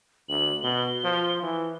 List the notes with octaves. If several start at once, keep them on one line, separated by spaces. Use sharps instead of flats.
D2 F#7
B2 G7
F3
E3